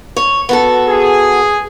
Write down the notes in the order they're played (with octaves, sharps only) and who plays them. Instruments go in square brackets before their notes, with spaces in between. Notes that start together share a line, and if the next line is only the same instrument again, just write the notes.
[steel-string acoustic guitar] C#5
B3 F#4 A4
[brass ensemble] G#4